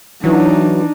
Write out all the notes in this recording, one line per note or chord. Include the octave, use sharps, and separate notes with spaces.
E3 F#3 D4 D#4